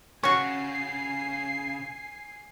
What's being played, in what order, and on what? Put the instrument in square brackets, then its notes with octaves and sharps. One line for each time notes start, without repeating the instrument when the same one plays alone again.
[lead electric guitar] C#3 [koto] C#4 F#4 [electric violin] G#5 C7 [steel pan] C#6